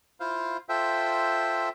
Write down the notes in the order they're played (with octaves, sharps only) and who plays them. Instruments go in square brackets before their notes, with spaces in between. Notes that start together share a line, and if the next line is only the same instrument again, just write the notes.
[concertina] E4 F4 C5 F5
F4 A4 C5 E5 G5